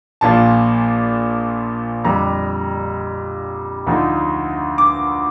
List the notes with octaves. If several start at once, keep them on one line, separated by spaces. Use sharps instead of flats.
A#1 A#2 F3 A5
F2 D3 G3 D4 A#5
D2 D3 F3 A3 D#4
D6